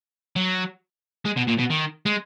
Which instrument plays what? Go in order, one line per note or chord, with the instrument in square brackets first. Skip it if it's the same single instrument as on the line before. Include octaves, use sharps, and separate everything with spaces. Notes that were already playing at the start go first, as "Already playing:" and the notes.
[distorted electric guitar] F#3
G#3
B2
A#2
B2
D#3
G#3